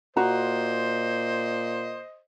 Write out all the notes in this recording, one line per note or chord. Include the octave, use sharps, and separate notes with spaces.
A#2 F#4 C5 D#5 A#5